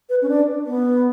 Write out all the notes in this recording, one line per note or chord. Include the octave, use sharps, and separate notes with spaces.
B4
C#4
D4
B3